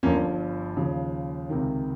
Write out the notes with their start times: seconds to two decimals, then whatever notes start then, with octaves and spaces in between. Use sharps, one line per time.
0.03 G1 G2 F3 A#3 C#4
0.77 D#2 C#3 F3
1.50 C#2 C3 D#3